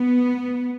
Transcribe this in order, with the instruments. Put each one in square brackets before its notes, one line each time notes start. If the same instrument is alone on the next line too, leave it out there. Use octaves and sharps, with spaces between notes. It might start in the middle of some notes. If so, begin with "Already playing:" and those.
Already playing: [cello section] B3